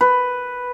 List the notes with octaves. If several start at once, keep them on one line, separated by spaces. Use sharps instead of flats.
B4